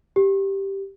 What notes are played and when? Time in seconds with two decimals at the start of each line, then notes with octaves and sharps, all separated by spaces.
0.16 G4